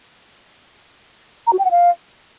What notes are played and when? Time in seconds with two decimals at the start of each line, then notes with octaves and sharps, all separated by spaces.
1.47 A#5
1.53 F#4
1.59 G5
1.65 F#5
1.71 F5